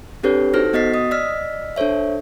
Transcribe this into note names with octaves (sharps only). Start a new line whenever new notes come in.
C4 D4 G4 A4 B4 C#5
D#4 F#4 A4 C5 F6 A#6
B3 F#4 D#5 A6 B6 C7
D#5 D#6
D5 D#5 E6 F6 B6
D4 A4 C5 C#5 E5